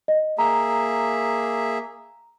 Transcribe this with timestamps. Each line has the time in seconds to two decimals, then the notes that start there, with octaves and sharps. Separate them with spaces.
0.08 D#5
0.39 A#3 G#4 E5 A#5